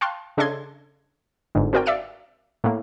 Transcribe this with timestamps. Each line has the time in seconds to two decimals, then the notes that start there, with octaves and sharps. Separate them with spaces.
0.01 F5 G5 A5 C6 C#6 F#6
0.37 C#3 D4 A4 D#5 C6 G#6
1.55 G1 G#2 D3
1.73 C4 F#4 A#4 D5 G5
1.86 D5 E5 F5 E6 C#7 D7
2.64 A2 A#3